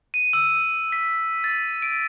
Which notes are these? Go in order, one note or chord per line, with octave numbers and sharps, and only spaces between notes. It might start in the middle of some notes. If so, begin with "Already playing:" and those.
D#7
E6
B6
A6
D7